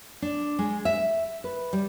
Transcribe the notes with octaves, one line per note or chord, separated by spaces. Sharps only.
D4
G#3
E5
B4
G3